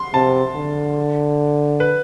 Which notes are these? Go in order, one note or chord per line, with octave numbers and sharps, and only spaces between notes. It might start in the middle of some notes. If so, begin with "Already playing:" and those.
Already playing: C6
C3 A5
D3
B4